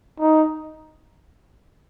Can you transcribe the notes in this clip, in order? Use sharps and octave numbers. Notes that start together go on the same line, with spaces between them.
D#4